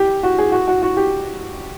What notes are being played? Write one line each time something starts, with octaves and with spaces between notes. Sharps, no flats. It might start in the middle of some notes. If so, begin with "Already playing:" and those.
Already playing: G4
F#4
G#4
F#4
F#4
F#4
G4